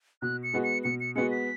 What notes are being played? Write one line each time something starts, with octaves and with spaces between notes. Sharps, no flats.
B2 F#6
C#7
G#3 B3 F#4
C#7
B2 C#7
C#7
G#3 B3 F#4 C#7
B6